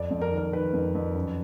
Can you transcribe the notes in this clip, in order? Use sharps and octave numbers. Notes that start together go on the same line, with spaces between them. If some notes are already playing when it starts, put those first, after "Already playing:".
Already playing: F2 D5
F2
A#4
D#3
A#4
D#3 B4
F2
F2
F#2